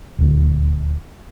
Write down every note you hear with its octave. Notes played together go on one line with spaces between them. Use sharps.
D#1 D2